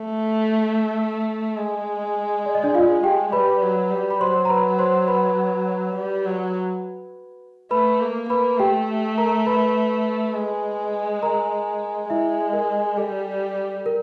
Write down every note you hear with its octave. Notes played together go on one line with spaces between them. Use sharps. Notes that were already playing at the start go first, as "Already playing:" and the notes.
Already playing: A3
G#3
D5
D#5
D4 D5
F4 F5
G4 G5
G3 B4 B5
F#3
G3
B5
F#3 C5 C6
A#5
B4 B5
C5 C6
B4 B5
G3
F#3
A3 B4 B5
A#3
A#3 B4 B5
A3 G4 G5
A#4 A#5
B4 B5
G#3
A#4 A#5
G#3 E4 E5
A#4
G3 A4
A#4